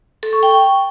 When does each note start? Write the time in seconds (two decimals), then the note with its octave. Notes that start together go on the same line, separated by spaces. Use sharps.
0.23 A4
0.33 C#6
0.43 G5